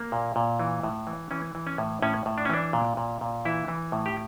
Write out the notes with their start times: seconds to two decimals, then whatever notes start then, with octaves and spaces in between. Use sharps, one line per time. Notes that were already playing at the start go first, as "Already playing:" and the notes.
Already playing: A#3
0.12 A#2
0.36 A#2
0.60 E3
0.83 A2
1.07 E3
1.31 E3 C#4
1.55 E3
1.67 C#4
1.78 A2
2.02 A2 C#4
2.26 A2
2.38 D4
2.45 C#4
2.50 E3 D4
2.73 A#2
2.97 A#2
3.21 A#2
3.45 E3 E4
3.68 E3
3.92 A2
4.06 G4